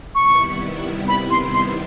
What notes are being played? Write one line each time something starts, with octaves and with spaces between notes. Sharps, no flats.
C3 D#3 G3 B3 E4 C#6
B5
C6
C6